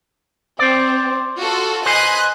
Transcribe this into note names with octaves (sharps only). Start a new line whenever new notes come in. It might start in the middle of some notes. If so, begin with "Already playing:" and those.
C4 C5 D5
F4 F#4 A4
B4 C5 D#5 G#5 F#6